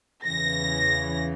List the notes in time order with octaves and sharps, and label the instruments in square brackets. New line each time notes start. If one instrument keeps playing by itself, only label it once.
[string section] E2 C#3 E3 A#6